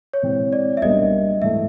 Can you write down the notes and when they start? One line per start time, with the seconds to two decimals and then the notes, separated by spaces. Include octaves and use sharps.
0.13 C#5
0.22 C3 E3 G#3 C4
0.53 D5
0.77 E5
0.82 B1 B2 G3 A#3 D4 D#5
1.41 G#2 E3 A3 E5